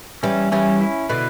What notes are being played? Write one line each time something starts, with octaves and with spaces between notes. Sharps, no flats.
E3 G3 C#4
E3 G3 C#4
E4
B2 D3 B4